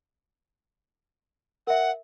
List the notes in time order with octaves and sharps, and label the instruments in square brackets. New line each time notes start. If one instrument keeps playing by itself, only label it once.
[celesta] A#4 E5 [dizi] F#5